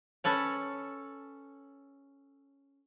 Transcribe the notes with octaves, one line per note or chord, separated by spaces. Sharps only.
C#4 A4 B4 C#5